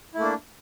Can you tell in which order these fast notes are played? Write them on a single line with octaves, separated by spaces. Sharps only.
E4 A3 A#3 D4